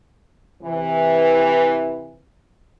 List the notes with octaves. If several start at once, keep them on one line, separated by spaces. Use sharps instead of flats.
C3 E3